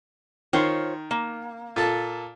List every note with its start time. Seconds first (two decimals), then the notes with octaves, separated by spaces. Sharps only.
0.53 D#3 F4 C5 C#5
1.11 A#3
1.76 A#2 A4 A5